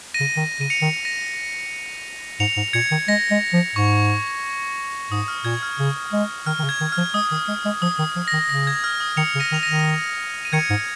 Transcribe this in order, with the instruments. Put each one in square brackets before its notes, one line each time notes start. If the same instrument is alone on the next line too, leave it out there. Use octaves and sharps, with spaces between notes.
[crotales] A#6 D#7
[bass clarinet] C#3
D#3
[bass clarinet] C#3 [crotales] D#7
[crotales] C#7 F7
[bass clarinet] D#3
[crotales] A#6 D#7
[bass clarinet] G#2 [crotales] C#7 F7
[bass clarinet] G#2
[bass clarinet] A#2 [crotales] G#6 C#7
[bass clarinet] D#3
[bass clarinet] G#3 [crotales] A#6
[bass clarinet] G#3
F3
[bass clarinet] G#2 [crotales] C#6
[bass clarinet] G#2 [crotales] D#6
[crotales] F6
[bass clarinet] A#2 [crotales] G#6
[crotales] F6
[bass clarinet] C#3
G#3
[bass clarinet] D#3 [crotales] F6
[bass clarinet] D#3
C#3
[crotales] G#6
[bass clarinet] D#3
[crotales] F6
[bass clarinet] F3
[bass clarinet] G#3 [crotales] D#6
[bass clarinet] D#3
G#3
G#3
[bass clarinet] F3 [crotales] D#6
[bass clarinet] D#3
F3
[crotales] A#6
[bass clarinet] D#3
[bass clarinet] C#3 [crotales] A#6
[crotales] G#6
F6
D#6
[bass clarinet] D#3 [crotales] C#7 F7
[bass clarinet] C#3
[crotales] A#6 D#7
[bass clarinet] D#3
[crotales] F7
A#6 D#7
[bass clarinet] D#3
[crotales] D#7
[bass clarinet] D#3 [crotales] G#6 C#7
[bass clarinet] G#2